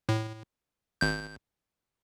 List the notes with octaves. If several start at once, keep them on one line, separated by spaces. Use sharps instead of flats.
A2
G#1 G6